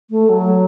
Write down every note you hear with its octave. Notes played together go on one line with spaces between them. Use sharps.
A3
F#3